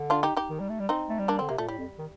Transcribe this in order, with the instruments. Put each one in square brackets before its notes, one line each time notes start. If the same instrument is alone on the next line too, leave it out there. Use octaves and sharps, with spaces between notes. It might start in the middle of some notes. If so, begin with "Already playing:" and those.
Already playing: [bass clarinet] D3
[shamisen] D4 F4
D#4 G4
D#4 G4
[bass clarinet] D#3
G3
A3
G3
[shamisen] C4 D#4
[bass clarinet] A3
G3
[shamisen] A#3 D4
[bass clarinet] D3 [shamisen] C4
[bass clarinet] C3 [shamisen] A#3
[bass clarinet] A#2 [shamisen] A3
[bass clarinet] A2 [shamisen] G3
[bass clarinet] F2
D#3